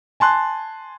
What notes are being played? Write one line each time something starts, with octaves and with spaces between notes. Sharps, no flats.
G#5 A5 C6 F#6